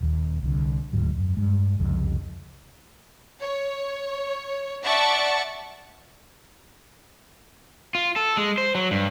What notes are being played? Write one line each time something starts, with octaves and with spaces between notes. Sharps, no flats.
D#1 D#2
C2 D3
D#1 D2 G#2 F#3
F#2
G2 G#3
C2 F2 C#3
C#5
D5 E5 F#5 A5 C#6 A6
F4
A4
G#3
C5
F#3
G2